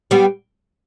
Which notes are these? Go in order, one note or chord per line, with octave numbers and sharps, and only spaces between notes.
G3 B3